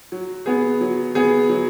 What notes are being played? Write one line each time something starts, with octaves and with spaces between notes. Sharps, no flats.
F#3
B3 G#4
F#3
B3 G#4
F#3